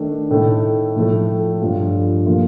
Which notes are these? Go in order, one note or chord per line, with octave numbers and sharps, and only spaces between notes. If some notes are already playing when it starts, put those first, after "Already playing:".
Already playing: D#3 A3 D4
A2 A3 D#4 A4
A2 F3 A3
G2 F3 A3 D4 F4
A#2 F3 A#3 F4 A4